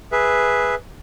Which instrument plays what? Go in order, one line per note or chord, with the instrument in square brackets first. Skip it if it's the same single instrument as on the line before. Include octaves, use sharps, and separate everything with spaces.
[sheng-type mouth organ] G#4 B4 E5